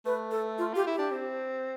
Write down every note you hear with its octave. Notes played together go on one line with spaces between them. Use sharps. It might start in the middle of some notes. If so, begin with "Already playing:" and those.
A3 B4
A4
F4
F4 G4
E4
G4
D4
C4